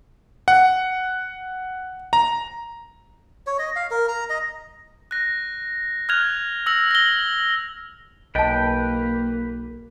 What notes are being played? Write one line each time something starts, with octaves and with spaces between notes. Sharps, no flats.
F#5
A#5
C#5
D#5
F5
A#4
A#5
D#5
F#6 A#6
F6 F#6 G#6 F7
E6 A#6 F#7
A#6 G7
B1 A#3 B4 D#5 G5 A5